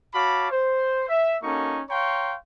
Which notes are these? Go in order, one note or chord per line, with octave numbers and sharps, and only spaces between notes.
F#4 C#5 F5 A5 B5 D6
C5
E5
A#3 C#4 D#4 F#4 A4 C#6
C#5 F5 G5 A#5 C6 C#6